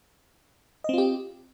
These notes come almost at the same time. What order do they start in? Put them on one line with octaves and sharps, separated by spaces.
D#5 C4 F4 G4